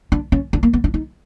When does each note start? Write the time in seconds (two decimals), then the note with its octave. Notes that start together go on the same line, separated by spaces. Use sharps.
0.12 D4
0.32 C#4
0.53 D4
0.63 A#3
0.73 B3
0.84 D4
0.94 D#4